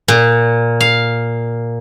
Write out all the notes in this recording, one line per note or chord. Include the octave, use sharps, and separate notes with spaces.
A#2
F5